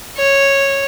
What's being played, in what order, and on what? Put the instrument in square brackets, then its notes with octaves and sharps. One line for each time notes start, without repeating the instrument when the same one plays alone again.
[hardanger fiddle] C#5